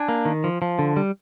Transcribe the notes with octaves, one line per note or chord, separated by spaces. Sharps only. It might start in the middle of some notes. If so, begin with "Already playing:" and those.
Already playing: D4 G#5
A#3
D#3
F3
F3
D3
G3